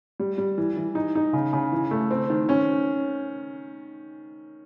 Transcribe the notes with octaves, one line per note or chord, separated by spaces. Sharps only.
G3
G3
E3
E3
D#4
D#4
C#3
C#3
E3
A3
C4
D#3
C#4